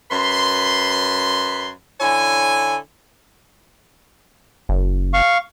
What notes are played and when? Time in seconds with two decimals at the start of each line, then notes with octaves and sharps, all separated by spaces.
0.11 F#2 B4 B5 C6
2.01 D3 E4 C#5 G#5
4.69 F#1
5.14 F5 C#6